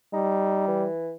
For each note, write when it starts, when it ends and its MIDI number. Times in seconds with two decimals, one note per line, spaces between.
0.13 0.86 55
0.13 0.65 63
0.68 1.15 52